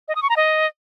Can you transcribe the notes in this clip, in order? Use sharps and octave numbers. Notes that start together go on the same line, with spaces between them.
D#5
D#6
C#6
A#5
D#5